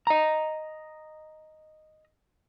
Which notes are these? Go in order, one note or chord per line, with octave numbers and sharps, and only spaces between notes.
D#5 A#5